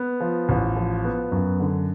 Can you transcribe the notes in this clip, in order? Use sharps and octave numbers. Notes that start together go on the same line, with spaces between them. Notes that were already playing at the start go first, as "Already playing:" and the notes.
Already playing: B3
F3
A1
F3
B3
F#2
D3